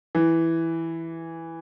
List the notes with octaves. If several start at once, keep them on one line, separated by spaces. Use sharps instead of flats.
E3